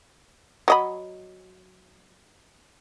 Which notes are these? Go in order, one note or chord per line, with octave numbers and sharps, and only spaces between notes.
F#3 D#5 B5